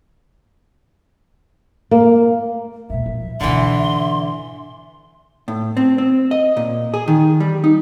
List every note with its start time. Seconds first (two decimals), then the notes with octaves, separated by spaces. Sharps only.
1.91 A#3
2.90 A#2 G#3 E5
3.06 F3
3.41 G#2 B2 D3 E3 C6
5.48 A2
5.77 C4
5.98 C4
6.31 D#5
6.57 A#2
6.94 G#4
7.08 D#3
7.40 G3
7.64 D#4